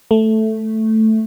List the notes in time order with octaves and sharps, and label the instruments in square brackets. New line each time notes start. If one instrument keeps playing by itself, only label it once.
[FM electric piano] A3